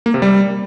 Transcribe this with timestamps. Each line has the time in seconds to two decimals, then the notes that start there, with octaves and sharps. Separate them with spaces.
0.06 A#3
0.14 C3
0.22 G3